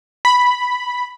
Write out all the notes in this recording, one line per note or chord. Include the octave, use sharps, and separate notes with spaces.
B5